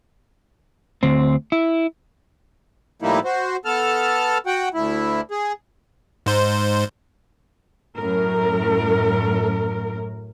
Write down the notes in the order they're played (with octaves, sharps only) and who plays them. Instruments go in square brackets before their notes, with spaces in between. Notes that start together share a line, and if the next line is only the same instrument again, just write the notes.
[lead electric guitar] D2 C4
E4
[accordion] A2 F3 G3 A#3 D#4 E4
F#4 C5
B3 A4 A5 F6
F#4 F#5 G5
D2 E4
G#4
[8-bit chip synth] G#2 C5
[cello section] F#2 A2 A#4